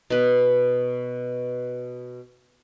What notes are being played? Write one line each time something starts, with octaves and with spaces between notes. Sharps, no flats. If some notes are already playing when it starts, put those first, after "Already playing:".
B2 B4